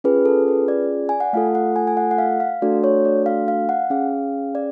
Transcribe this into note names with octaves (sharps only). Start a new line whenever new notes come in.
C#4 F4 G#4 B4
A4
B4
D5
G#5
F#5
A3 F4 A4 F5
F#5
G#5
G#5
F#5
F#5
F5
F5
A3 D4 F#4 A4 D5
C#5
D5
F5
F5
F#5
C#4 G#4 F5
D5